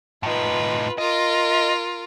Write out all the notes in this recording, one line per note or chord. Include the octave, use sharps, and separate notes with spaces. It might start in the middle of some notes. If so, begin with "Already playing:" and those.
A2 D#4 F4 B4
F4 A#4 D#5